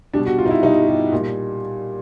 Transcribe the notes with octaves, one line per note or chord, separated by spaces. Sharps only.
B2 G3 D4
F#4
F4
D#4
E4
B2 G3 D#4
G4
A#2 G3